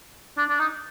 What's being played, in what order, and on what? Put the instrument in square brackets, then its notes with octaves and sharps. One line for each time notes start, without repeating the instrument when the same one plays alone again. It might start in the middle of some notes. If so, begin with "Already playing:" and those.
[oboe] D4
D4
D#4